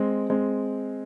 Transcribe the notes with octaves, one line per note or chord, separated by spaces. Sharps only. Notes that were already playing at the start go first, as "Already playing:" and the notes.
Already playing: G#3 C4
G#3 C4